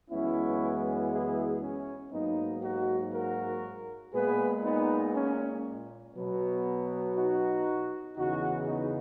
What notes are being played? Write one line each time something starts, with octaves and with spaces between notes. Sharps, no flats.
F#2 E3 G#3 B3 C#4 E4
E4 G#4
C#4
G#2 F#3 A#3 B3 D#4
D#4 F#4
F#4 A#4
A#2 G#3 B3 G#4 B4
B3 D#4
C#4
B2 F#3 B3
D#4 F#4
E2 C#3 E3 D#4 F#4
B3 D#4